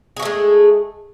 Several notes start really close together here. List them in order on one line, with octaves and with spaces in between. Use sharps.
G#4 F#4 A3 G#3